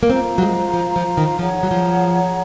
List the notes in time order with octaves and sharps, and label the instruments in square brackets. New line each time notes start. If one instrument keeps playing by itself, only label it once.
[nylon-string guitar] A#3
[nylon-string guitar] C4 [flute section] F4 C5 F5 A#5
[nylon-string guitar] F#3
G#3
F3
F3
D#3
[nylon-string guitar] F3 [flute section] G#4 C#5 F#5 A#5
[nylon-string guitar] F#3
F3